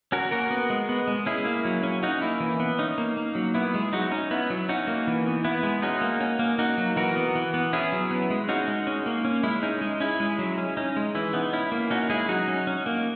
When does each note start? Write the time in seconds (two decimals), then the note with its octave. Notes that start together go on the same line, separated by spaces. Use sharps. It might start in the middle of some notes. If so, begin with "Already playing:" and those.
0.12 C#4 F#4 A#4
0.31 A#3 F#4 A#4
0.51 B3
0.70 G#3
0.89 B3
1.08 G#3
1.26 C#4 E4 G#4
1.45 A#3
1.65 F#3
1.83 C#4
2.03 C#4 D#4 F#4
2.22 A#3 E4
2.40 E3
2.60 B3
2.79 C#4 D#4
2.98 A#3
3.17 A#3
3.35 F#3
3.54 B3 E4
3.74 G#3
3.93 F#3 D#4 F#4
4.12 C#4 D#4
4.31 B3 E4
4.50 F#3
4.69 C#4 D#4 F#4
4.88 A#3
5.07 E3
5.26 B3
5.44 B3 E4
5.63 G#3
5.82 C#4 D#4 F#4
6.01 A#3
6.21 C#4
6.39 A#3
6.59 A#3 D#4 F#4
6.78 F#3
6.96 E3 F#4 A#4
7.15 B3
7.35 E3
7.54 B3
7.73 C#4 E4 G#4
7.92 F#3
8.11 B3
8.30 G#3
8.48 C#4 D#4 F#4
8.68 G#3
8.87 C#4
9.06 A#3
9.25 C#4
9.43 G#3 E4
9.63 C#4 D#4
9.81 G#3
10.00 C#4 E4
10.20 G#3
10.39 F#3
10.58 C#4
10.77 C#4 D#4
10.97 G#3
11.15 E3 E4
11.33 B3 D#4
11.53 C#4 E4
11.72 A#3
11.90 C#4 D#4 F#4
12.10 G#3 E4 G#4
12.29 F#3 D#4 F#4
12.48 C#4
12.67 C#4
12.86 A#3